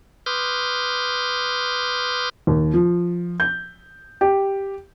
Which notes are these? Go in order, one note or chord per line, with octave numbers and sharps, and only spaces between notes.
B4 C6 D6 D#6 F6 G6
D#2
F3
G6
G4